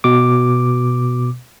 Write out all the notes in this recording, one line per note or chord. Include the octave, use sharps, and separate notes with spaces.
B2 D6